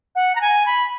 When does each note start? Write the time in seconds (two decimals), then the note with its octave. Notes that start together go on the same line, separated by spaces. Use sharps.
0.15 F#5
0.35 A#5
0.41 G#5
0.66 B5